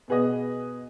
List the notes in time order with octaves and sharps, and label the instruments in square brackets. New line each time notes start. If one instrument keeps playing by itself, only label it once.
[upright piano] B2 B3 G#4 B4 D#5